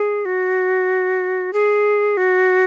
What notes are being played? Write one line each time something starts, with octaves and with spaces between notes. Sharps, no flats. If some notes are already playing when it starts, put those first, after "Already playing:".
Already playing: G#4
F#4
G#4
F#4